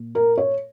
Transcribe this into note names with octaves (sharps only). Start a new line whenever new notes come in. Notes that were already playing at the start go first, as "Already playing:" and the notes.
Already playing: A#2
A#4
C#5